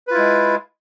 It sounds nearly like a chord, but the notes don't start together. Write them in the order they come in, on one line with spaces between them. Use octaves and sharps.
B4 F4 E4 G#3